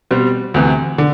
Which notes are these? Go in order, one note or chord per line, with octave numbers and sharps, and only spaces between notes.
B2 G3 C4
D2 C3 E3
D3